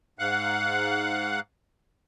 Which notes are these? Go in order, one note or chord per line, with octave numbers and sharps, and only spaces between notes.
G#2 F5 F#5 F#6